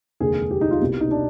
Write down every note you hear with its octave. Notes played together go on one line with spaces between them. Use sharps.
F1 D#2 D3 G#3 G#4
G4
D#4
F4
C2 B2 G3
D#4
D4